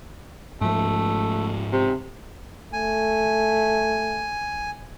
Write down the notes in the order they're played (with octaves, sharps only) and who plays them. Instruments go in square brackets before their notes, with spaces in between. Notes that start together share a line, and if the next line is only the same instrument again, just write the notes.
[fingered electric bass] G#2 F3 [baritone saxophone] A3
[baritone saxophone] C3
[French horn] A3 [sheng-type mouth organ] G#5